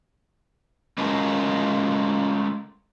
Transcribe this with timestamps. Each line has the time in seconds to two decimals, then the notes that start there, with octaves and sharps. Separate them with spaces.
0.98 G#3 A3 C#4 F4 F#4 A#4